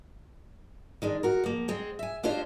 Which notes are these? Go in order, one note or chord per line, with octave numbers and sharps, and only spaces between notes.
D#3 G#3 D4
F#4 A#4
F3 A#3
G#3 C4 G#4
E5 G#5
D4 F4 G4 C5 C#5 D#5